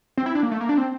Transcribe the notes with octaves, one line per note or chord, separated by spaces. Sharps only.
C4
E4
D4
A#3
A3
A#3
D4
C4